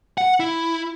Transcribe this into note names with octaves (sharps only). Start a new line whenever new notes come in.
F#5
E4